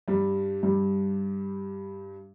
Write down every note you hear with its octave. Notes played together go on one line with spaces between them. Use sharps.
G2 G3
G2 G3